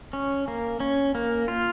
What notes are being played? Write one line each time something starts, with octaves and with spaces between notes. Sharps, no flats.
C#4
A#3
C#4
A#3
F4